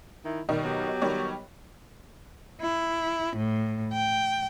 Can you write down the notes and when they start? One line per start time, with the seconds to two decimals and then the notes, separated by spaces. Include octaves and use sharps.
0.25 D#3 E4
0.49 B2 D#3 G3
0.64 F#3 B3 G4
1.02 D#3 G3 C#5
2.62 E4
3.37 A2
3.93 G5